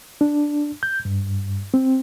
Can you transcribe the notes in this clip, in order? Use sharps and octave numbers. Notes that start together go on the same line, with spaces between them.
D4
G6
G2
C4